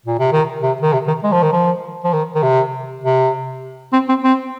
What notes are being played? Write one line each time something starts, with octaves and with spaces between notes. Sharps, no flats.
A#2
C3
D#3
C3
D#3
C3
D#3
G#3
F3
D#3
F3
F3
D#3
D#3
C3
C3
C4
C4
C4